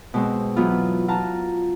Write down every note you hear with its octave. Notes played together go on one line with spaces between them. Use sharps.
B2 G#3 C4
E3 F#3 B3 F4
F4 F#4 A5 A#5